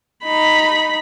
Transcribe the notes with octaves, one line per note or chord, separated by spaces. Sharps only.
D#4 B5